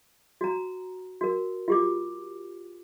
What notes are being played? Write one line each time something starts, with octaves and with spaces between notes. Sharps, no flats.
F#4 A#5
F#4 A#4
F4 G4 D6